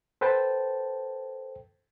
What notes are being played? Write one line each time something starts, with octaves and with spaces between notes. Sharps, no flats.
A4 B4 C5 G5 A5